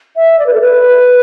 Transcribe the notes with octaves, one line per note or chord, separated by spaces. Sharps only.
E5
D5
B4
A4
B4